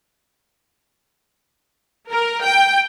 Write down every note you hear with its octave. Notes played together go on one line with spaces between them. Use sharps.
A#4
G5